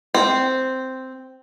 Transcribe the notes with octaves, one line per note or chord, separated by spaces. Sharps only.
C4